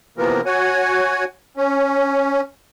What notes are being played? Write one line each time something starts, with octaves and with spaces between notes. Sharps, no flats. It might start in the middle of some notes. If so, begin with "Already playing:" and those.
C3 E3 F3 A#3 B3 A#4
F#4 C#5 F#5 G#5
C#4